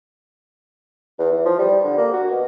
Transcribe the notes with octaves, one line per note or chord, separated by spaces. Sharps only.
E2
E3
F3
G3
D3
A#3
F#4
B2